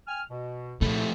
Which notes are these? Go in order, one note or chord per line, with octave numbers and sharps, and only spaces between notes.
G5 G#5 F6
B2
A#2 C#3 F3 A3 D#4 E4